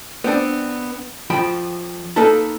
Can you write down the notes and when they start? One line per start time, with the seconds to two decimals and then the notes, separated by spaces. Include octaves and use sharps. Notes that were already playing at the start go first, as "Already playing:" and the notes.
0.24 B3 C4 D4
1.30 F2 F3 G5 B5
2.16 A#3 D#4 A4 B4 A5